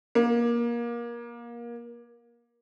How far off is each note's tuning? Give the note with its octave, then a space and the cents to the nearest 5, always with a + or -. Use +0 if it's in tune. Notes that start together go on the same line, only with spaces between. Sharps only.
A#3 +25